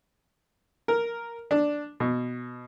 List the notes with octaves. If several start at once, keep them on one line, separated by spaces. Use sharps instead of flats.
A#4
D4
B2